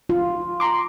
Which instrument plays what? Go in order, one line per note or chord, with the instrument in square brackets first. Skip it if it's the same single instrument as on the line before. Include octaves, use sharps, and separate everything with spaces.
[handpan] F4
[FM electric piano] A#5 C6 D6